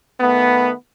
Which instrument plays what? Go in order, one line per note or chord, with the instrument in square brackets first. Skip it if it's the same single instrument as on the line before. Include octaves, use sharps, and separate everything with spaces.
[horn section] D#3 A3 B3